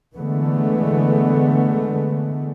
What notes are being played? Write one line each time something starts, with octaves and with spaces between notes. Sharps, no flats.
D3 E3 G#3 A3 B3